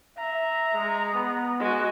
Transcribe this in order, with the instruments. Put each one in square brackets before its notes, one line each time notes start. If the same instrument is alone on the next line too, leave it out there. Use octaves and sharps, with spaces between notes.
[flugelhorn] E5 [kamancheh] A#5
[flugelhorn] G#3
B3
[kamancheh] G#3 F#4